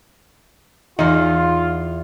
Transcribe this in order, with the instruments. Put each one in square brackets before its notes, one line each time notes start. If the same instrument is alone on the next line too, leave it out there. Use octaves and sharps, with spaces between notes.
[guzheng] E2 F5 C6 [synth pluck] D#4 [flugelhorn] F4